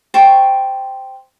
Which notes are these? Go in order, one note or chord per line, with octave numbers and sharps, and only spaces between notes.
C5 G5 A5 C#6